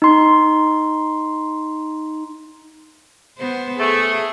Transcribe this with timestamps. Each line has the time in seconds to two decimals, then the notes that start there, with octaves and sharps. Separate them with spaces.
0.02 D#4 C6
3.38 B3 C5
3.80 A3 G#4